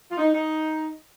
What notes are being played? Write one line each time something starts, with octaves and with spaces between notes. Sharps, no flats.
F4
D#4
D#4